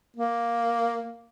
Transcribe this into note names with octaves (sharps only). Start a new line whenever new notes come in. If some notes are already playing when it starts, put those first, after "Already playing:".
A#3